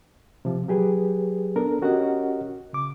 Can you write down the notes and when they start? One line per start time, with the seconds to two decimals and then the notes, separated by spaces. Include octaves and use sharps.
0.45 C3 F3
0.68 F#3 G4 G#4 B4
1.56 B3 D4 A4 A#4
1.82 C#4 F#4 G4 A#4 D#5 F#5
2.73 C#3 D6